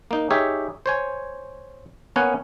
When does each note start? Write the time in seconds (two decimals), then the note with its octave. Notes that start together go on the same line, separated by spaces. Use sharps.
0.11 A#3 D#4
0.30 D#4 G4 G#4 C#5 E5
0.86 C5 C#5 G#5
2.16 A#3 B3 C#4 F#5 G#5